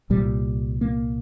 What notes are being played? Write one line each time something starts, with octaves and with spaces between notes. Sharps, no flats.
C2 A#2 G3
A#3